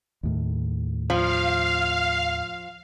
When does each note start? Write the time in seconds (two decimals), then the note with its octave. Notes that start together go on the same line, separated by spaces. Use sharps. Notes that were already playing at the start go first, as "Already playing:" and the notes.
0.23 D#2 A2
1.10 F3 F5